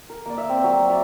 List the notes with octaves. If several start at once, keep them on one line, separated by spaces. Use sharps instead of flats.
A#4
A#3 D5
E5 F5
C4
F#3 A#4
D5 E5